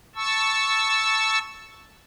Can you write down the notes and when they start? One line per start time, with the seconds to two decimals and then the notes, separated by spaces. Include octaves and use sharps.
0.16 A5 C#6 E6